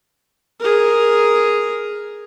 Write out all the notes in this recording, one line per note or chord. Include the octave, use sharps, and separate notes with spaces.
G#4 A#4